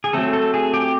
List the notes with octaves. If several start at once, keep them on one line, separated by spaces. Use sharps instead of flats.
G#4
F#3 A3 C4 A4
A4
G#4
G4